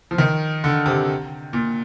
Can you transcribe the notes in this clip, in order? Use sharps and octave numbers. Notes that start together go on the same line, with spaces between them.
F3
D#3
D3
C3
A#2